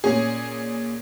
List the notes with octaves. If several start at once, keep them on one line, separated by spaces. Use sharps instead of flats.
A#2 C#4 G#4